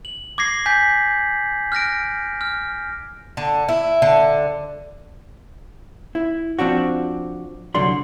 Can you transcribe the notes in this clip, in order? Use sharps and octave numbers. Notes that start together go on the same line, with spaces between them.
F#7
D6 G#6 A#6 C7
G#5 G6 B6
F6 F#6 A#6 D7
F6
D3
E4
D3
E4
F3 C4 D4 F#4
C2 D3 F#3 D5 C6